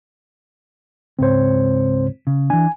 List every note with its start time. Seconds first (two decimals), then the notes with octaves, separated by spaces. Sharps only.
1.19 C#2 G#2 C4 C5 C#5
2.27 C#3
2.50 E3 D4 G#5